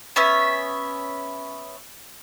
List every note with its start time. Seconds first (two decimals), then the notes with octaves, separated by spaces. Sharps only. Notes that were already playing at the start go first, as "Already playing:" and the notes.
0.16 B3 C#4 E5